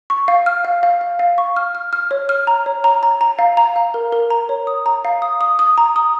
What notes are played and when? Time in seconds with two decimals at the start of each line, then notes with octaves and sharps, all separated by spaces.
0.10 C#6
0.28 F5
0.46 F6
0.65 F5
0.83 F5
1.01 F5
1.19 F5
1.38 C#6
1.56 F6
1.75 F6
1.93 F6
2.11 C#5
2.29 F6
2.47 A#5
2.66 C#5
2.84 A#5
3.03 A#5
3.21 A#5
3.39 F5
3.57 A#5
3.76 F5
3.94 A#4
4.12 A#4
4.30 A#5
4.49 C#5
4.67 D#6
4.86 A#5
5.05 F5
5.22 D#6
5.41 D#6
5.59 D#6
5.78 A#5
5.96 D#6